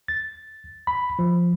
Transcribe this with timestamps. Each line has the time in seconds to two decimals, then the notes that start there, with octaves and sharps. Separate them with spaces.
0.08 A6
0.87 B5
1.19 F3